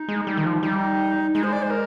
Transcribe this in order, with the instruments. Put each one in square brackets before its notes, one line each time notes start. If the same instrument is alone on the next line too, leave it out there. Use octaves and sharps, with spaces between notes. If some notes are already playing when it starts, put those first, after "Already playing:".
Already playing: [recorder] D#4
[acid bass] G#3
G3
D#3
F3
[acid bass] G3 [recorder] D#4
[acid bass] G#3 [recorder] D#4
[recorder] C5
D5
C5
A#4